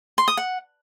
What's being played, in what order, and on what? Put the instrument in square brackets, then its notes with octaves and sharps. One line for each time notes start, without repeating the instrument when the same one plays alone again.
[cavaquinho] C6
D#6
F#5